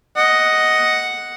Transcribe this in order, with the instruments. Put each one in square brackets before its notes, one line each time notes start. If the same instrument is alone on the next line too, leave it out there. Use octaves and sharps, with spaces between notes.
[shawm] D#5 [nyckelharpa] F#5